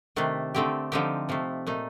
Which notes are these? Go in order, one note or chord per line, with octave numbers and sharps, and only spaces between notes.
C3 D#3 A3 D4
D3 A3 C4 G4
D3 F3 C4 D#4 G4
C3 F3 A3
A#2 A3 D#4